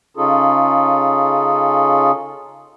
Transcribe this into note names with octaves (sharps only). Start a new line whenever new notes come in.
C#3 C#4 D#4 F4 G#4 A4